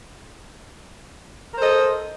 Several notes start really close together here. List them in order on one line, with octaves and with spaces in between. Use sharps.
A#4 C5 A4 D#5